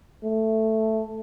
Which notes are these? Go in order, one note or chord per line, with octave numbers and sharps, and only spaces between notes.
A3